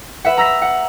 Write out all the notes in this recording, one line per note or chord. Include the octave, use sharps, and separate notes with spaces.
B4 E5 F#5
A#5 E6 A#6 B6
F#5